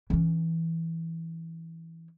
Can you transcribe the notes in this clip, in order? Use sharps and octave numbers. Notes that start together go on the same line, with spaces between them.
E3 C#4